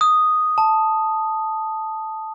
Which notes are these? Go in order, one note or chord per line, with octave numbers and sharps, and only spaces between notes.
D#6
A5